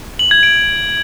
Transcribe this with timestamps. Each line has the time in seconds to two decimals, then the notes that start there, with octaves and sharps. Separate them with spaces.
0.19 F#7
0.31 G#6
0.43 D7